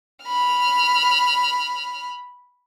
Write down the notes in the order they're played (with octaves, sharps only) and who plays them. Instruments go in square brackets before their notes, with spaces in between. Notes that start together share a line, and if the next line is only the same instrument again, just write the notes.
[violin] B5 F6